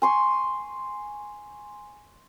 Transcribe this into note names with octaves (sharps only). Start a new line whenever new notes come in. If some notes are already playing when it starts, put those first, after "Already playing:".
G#5 C6 C#6